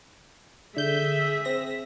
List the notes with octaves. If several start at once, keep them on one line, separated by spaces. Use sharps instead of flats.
D3 G#4 E5 G6
C4 A#6